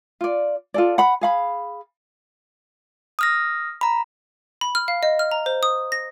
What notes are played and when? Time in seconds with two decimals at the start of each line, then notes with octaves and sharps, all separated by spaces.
0.21 F4 D5
0.74 F4 A4 D5
0.98 F#5 B5
1.21 G#4 F5 B5
3.19 D#6 F6 A#6
3.81 A#5 B5
4.61 B5
4.75 F6
4.88 F5
5.03 D#5
5.19 F6
5.32 A#5
5.46 C5
5.63 D#6
5.92 A#6